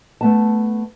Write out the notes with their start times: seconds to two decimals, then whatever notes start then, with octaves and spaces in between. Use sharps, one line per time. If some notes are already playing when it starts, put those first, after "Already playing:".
0.21 A3 B3 A5